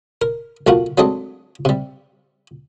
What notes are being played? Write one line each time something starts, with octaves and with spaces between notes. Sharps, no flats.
A#4
B1 A3 F4 F#4 A#4
F#3 G#3 A3 C4 D4 D#5
C3 G3